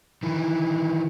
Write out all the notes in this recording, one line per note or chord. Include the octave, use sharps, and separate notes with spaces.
D#3 E3